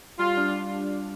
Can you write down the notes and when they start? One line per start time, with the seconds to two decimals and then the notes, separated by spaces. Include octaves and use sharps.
0.19 G3 F4
0.37 D4